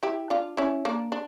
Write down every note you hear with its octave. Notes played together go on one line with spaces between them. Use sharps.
E4 G4
D4 F4
C#4 E4
A#3 D4
D4